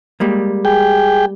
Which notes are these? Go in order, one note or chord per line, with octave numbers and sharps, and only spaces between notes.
G3 G#3 A#3
G#4 G5